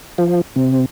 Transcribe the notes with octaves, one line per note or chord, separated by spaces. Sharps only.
F3
C3